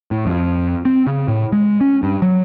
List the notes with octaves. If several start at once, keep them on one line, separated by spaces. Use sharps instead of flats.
A2
F2
C4
C#3
A2
G#3
C#4
G2
F#3